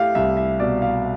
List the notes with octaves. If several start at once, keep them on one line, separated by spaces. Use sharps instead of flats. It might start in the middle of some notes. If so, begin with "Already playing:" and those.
Already playing: A3 E4 G4 F5
C2 E5
E5
B2 D5
F5